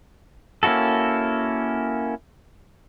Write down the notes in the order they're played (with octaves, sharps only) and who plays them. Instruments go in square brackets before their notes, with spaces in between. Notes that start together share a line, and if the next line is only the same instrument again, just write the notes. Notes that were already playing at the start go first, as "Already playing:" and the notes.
[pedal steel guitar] A#3 C#4 E4 F#4 A4